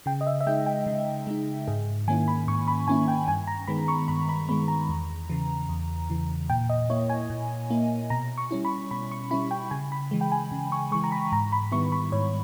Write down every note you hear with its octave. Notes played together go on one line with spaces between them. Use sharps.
C#3 G5
D#5
E5
E5
G#3 D#4 G5
G5
C#3
G#3 D#4
G#2 G#4
D#3 A#3 C#4 E4 G#5
B5
G#2 C#6
B5
D#3 A#3 C#4 E4 G#5
G5
G2 G#5
A#5
D#3 G#3 B3 B5
C#6
G2 B5
B5
D#3 G#3 B3 B5
A#5
E2
C#3 E3
E2
C#3 E3
A#2 G5
D#5
A#3 E4 C#5
G#5
A#2
A#3 E4
B2 A#5
C#6
G3 C#4 E4
B5
B2 B5
C#6
G3 C#4 E4 B5
G5
C#3 G#5
B5
E3 G#3
G5
G#5
C#3
C#6
E3 G#3 C#6
A#5
B5
G#2 A#5
B5
D#3 G3 B3 E4 C#6
B5
G#2 C#5